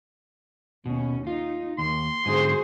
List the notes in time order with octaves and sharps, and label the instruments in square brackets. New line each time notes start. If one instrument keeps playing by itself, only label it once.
[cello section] D#2 C#4 [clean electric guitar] B2
[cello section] D#4 [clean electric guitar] F4
[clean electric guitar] D#2 [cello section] A#3 [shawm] C6
[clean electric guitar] G#2 D3 [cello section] F#4 G#4 C5